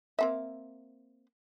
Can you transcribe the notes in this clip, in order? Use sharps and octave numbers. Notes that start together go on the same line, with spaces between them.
A#3 C4 E5